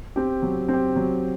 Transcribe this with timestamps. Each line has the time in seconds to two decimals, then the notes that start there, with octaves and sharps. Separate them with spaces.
0.16 C4 G4
0.43 F#3
0.68 C4 G4
0.96 F#3